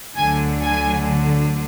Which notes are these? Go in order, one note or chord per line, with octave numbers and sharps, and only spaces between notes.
D2 D3 F#3 G#5
G#5